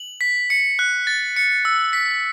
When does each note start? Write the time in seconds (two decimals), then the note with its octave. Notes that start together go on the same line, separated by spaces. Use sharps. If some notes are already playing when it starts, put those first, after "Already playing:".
Already playing: F#7
0.21 B6
0.50 C#7
0.79 F#6
1.07 A6
1.36 C#7
1.65 E6
1.93 B6